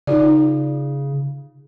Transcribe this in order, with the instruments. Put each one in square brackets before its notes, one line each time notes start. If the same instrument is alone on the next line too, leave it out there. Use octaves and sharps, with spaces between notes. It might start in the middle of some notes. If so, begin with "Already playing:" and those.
[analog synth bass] C#3 [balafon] D#4 F4 D5